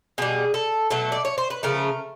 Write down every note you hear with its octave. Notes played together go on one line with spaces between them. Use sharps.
B2 G3 G#4
A4
B2 F#3 A3 A4
D5
C#5
C5
B4
C#3 F3 A3 A#4